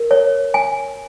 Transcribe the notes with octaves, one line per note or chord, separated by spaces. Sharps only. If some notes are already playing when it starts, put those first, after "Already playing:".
Already playing: A#4
C#5
G#5